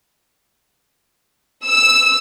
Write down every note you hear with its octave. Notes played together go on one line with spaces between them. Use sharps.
E6